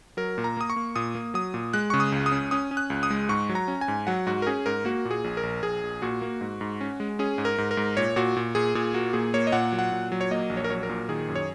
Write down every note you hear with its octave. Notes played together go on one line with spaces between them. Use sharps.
F#3 A#4
A#2
A#5
A#3 D#6
C#6
A#3
A#2 D#6
A#3
F#3 D#6
A#2
G#3 F#6
C#3 C#6
D#6
C#2
D#6
C#4
C#4 D#6
C#4
F#6
C#2
D#6
G#3
G#2 C#6
F#3
A#5
C#4
G#5
G#2
F#3 F#5
G#2 F#4
A#4
C#4 G#4
G#2 A#4
A#3 F#4
A#2
G#4
A#1
A#4
A#1
A#1 G#4
A#1
A#2 F#4
A#3
G#2
G#2
C#4
G#3
C#4 G#4
G#2
A#4
G#2
A#4
G#2
A#2 C#5
A#2 F#4
A#2
A#2 G#4
A#2 G#4
A#3 F#4
A#2 G#4
A#3 C#5
D#5
A#2 F#5
F#3
F#5
A#2
F#3
C#5
A#3 D#5
A#1
C#5
A#4
F#3 C#5
A#4
A#2
D#3 G#4
F#2
C#5